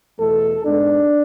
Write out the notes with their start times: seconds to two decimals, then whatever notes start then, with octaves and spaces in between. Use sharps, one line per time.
0.19 E2 B2 A3 A4
0.65 G#2 G#3 B3 D4